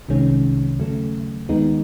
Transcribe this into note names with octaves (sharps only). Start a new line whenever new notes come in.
C2 C3 D#3 G#3 C#4
D#2 C#3 F#3 A3
D#2 D#3 G#3 B3 D#4